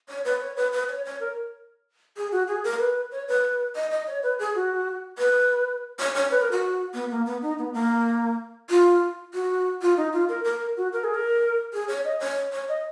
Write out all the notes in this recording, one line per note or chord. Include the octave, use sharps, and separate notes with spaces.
C#5
B4
C#5
B4
B4
C#5
C#5
A#4
G#4
F#4
G#4
A#4
B4
C#5
B4
D#5
D#5
C#5
B4
G#4
F#4
B4
C#5
C#5
B4
A#4
F#4
B3
A#3
B3
D#4
B3
A#3
F4
F#4
F4
D#4
F4
A#4
A#4
F#4
A#4
G#4
A#4
G#4
C#5
D#5
C#5
C#5
D#5